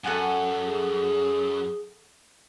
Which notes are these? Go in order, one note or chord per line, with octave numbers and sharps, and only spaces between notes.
F#2 A4 F#5 G#5
G#4